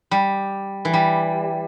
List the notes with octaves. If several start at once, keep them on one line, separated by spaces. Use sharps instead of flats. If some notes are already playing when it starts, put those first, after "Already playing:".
G3
E3
G3